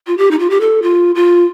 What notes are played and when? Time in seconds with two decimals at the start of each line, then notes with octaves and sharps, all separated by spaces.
0.07 F4
0.18 G4
0.31 D#4
0.39 F4
0.50 G4
0.60 A4
0.82 F4
1.15 F4